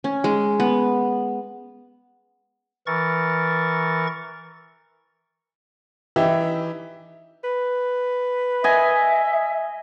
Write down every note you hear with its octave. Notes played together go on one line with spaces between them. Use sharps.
C#4
G#3
B3
E3 A#4 C#6 A6
E3 D#4 G4 E5
B4
D#5 E5 G#5